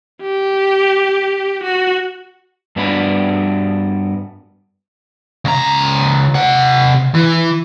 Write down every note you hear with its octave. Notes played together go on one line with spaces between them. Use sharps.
G4
F#4
G2 B3 D4 F#4 B4 B5
C#2 A#5
C3 F#5
E3